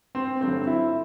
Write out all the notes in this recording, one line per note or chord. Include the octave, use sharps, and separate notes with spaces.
C4
G2 D3 F#3 A3 C4
E4